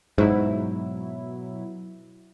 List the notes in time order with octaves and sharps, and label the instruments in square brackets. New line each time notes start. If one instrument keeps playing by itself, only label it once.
[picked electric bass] G#2 [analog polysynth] B2 F#3 E4